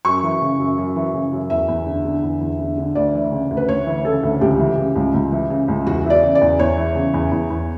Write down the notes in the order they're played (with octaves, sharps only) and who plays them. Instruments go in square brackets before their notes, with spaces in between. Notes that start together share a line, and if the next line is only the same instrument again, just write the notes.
[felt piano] F#2 C#6
E3
C#3
F#2
F#2
E3
C#3
F#2
E2 E5
E2
D3
D3
E2
E2
D3
D3
D2 D5
E3
C#3
D2
B4
D2 C#5
E3
C#3 A4
D2
C#2 G4
E3
C#3
C#2
C#2
E3
C#3
C#2
E2 F#4
E3
D5
C#3
D5
E2
E2 C#5
E3
C#3
E2
E2
E2